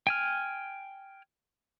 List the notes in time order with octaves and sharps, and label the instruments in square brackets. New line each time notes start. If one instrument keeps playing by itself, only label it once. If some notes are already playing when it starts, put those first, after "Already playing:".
[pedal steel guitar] G5 G#5 F6